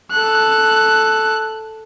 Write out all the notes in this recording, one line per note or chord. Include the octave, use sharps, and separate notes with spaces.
A4 F#6